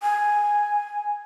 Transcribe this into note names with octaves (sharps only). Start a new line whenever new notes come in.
G#5